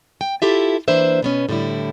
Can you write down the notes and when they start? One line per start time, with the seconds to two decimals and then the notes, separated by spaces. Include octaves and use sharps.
0.21 G5
0.42 E4 F4 G4 A4 E5
0.88 E3 A#3 D4 B4 C5 E5
1.22 B2 B3 C#4
1.49 A2 D3 G3 E4